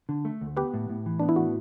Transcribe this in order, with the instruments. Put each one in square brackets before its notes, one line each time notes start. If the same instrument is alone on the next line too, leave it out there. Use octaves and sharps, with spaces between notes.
[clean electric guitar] D3
A3
D2
[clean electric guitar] B3 [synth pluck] G4 B4
[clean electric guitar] A2
A2
E3
[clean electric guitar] B3 [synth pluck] D4
[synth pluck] E4
[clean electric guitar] A2 [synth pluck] F#4